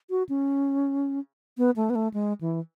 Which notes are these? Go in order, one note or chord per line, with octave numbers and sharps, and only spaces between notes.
F#4
C#4
B3
A3
B3
A3
G#3
E3